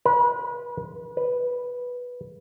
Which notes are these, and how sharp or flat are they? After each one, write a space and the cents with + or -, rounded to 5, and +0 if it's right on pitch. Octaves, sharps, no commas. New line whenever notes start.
B4 -35
B4 -5